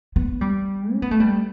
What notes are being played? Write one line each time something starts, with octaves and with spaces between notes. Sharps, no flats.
B3
G3
C#4
B3
A3
G3